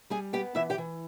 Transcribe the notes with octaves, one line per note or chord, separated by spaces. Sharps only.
G3 G#4 G#5
B3 G4 G5
E3 E4 E5
G4 G5
E3